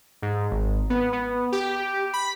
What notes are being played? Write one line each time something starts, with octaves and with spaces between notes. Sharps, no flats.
G#2
G#1
B3
B3
G4
B5